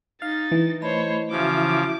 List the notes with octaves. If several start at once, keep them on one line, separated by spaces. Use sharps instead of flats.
D#4 F5 A6
E3
A3 C5 C#5 D#5 B5
C#3 F3 E4 F#4 E5 D6